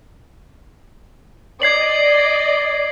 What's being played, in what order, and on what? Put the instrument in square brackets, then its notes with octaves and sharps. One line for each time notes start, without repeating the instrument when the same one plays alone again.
[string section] D5 D#5 [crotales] G#6 C7 F#7